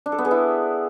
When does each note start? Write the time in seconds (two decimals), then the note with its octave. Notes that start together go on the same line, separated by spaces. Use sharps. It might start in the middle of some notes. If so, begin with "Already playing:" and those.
0.06 D4
0.12 A4
0.18 B3
0.25 G#4
0.31 E4